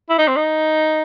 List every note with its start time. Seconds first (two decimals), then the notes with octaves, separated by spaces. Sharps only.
0.10 E4
0.18 D#4
0.28 C4
0.36 D#4